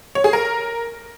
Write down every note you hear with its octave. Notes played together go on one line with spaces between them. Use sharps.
C#5
G#4
A#4